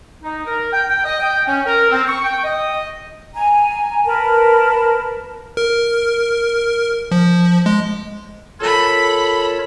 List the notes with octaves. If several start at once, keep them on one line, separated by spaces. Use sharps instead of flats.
D#4
A#4
G5
G5
D#5
G5
C#4
A#4
C4
C#6
G5
D#5
G#5 A#5
A#4 B4 A5 B5
A#4
F3
G#3
F4 A4 A#4 C#5 B5